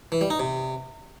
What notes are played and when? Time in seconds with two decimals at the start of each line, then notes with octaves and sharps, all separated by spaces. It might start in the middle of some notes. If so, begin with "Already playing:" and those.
0.12 E3
0.21 G3
0.30 D#4
0.40 C3